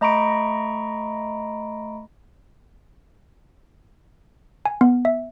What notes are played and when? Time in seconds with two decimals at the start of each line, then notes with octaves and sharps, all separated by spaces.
0.01 A3 D#5 A#5 B5 C#6 D7
4.65 G#5
4.81 B3
5.05 E5